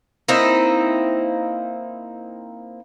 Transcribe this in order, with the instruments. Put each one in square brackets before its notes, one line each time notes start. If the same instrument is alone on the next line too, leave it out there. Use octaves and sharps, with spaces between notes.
[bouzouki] A#3 C4 D#4 E4